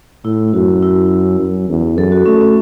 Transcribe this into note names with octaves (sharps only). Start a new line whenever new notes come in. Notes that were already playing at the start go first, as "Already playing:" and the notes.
A2 E4
F#2 F#4
E4
F#2
E2
F#2 A4
F#4
A3 C#4
C#4